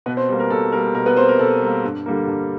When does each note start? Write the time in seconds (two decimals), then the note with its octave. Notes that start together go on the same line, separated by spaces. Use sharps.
0.06 B2 B3 B4
0.17 C4 C5
0.29 G3 A#3
0.40 A#4
0.50 B2 A4
0.72 G3 A#3 A#4
0.94 B2 A#4
1.06 B3 B4
1.17 G3 A#3 C4 C5
1.29 A#4
1.39 B2 A4
1.62 G3 A#3
1.84 G2
2.06 D3 G3 A#3
2.27 G2